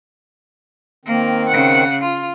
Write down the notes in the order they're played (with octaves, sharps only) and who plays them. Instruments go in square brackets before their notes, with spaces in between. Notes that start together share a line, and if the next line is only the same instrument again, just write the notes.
[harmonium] D#3 C4 [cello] A#3
[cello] C#3 F#5
F4